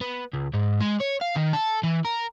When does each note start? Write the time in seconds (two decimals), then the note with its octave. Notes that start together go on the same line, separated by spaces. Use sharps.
0.01 B3
0.34 C#2
0.54 G#2
0.81 G#3
1.00 C#5
1.21 F5
1.36 D#3
1.53 A4
1.83 E3
2.05 A#4